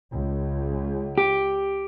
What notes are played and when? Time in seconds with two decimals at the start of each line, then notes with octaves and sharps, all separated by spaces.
0.12 C#2
1.18 G4